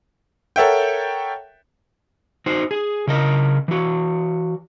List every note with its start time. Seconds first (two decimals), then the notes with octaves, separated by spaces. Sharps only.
0.56 A4 A#4 C#5 E5 F#5 G5
2.46 D#4 F#4 C5
2.71 G#4
3.07 C#3 A#4 D#5
3.68 E3 F#4